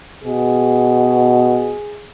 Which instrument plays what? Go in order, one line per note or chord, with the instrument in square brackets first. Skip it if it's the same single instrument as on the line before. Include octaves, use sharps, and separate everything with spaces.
[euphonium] B2 [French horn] G#4